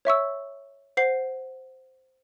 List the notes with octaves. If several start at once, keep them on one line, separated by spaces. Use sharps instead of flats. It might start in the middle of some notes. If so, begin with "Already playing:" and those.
C#5 E5 C#6 E6
C5 F#5 C7